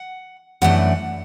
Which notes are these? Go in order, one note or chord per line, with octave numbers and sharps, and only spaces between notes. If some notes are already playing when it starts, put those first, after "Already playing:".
Already playing: F#5
F#2 E3 A3 D4 F#5